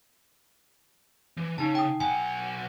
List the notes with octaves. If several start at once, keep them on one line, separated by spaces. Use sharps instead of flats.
E3
C#3 C#4 D#4 A5
G5 D#6
B1 F#5 G#5